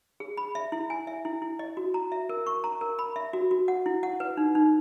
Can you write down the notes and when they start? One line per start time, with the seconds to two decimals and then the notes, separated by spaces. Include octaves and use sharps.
0.20 G#4
0.37 B5
0.55 E5
0.72 E4
0.90 G#5
1.07 E5
1.25 E4
1.42 E4
1.59 D#5
1.77 F#4
1.94 A#5
2.12 E5
2.29 A#4
2.46 C#6
2.64 A#5
2.81 A#4
2.99 B5
3.16 E5
3.33 F#4
3.51 F#4
3.68 F#5
3.86 E4
4.03 F#5
4.20 B4
4.37 D#4
4.55 D#4